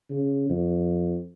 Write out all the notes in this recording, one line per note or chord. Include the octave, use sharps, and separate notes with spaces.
C#3
F2